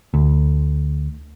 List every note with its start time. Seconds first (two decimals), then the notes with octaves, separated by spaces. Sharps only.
0.14 D2